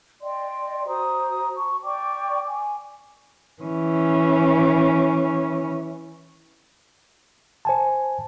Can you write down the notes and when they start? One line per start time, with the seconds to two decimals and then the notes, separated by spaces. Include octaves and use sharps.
0.21 D5 D#5 G5 C6
0.87 F#4 C5 A#5 D#6
1.55 A5 C#6
1.82 D5 G5 C#6 D6
2.48 G#5
3.63 E3 C#4
7.65 C5 G#5 A5